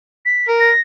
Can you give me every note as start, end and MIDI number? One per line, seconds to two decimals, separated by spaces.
0.26 0.47 95
0.48 0.69 70
0.60 0.80 94